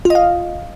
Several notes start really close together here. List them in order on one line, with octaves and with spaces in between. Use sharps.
F4 D#5 F5